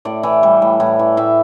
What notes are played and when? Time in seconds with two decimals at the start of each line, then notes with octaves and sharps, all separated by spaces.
0.05 A2 D5
0.23 E3
0.43 G3
0.62 A2
0.80 A2
0.99 E3
1.17 A2 E5